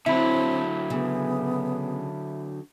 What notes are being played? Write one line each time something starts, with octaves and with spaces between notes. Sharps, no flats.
D3 F#3 C4 E4 E5 B5
C#3 B3